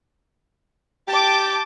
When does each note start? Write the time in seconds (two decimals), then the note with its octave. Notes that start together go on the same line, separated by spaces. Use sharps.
1.08 G4 G5 A5 D6 G6 A6